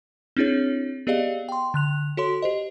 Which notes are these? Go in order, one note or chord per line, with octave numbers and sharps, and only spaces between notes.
C4 D4 E4 G#4 C#5
B3 G4 G#4 D5 D#5 F5
G5 C6
D3 F#6 F7
F#4 A4 C#5 C6
G4 C5 D#5